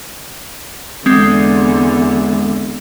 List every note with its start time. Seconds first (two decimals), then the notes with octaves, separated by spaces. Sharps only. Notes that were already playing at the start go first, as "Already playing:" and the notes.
1.06 E2 D3 G#3 C4